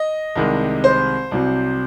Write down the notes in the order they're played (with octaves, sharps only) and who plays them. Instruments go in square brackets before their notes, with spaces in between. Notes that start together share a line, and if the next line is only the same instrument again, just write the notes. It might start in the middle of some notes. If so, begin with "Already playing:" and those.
Already playing: [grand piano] D#5
C2 C3 D#3 G#3
C5
C2 C3 F#3